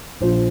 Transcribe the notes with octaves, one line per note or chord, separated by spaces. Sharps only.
A#1 A#2 F3 C5